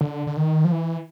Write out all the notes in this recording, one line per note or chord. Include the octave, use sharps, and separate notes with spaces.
D3
D3
D#3
F3
E3